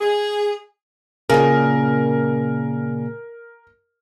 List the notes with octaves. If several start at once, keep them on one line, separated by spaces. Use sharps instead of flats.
G#4
A#2 C#3 A#4